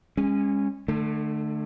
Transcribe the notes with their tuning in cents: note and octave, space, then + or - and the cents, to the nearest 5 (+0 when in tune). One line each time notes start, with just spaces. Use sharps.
G#3 -35 C#4 -10
D3 +35 A3 +0